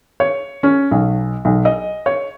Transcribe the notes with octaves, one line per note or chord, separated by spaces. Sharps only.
C#5
C#4
B1
B1
D#5
C#5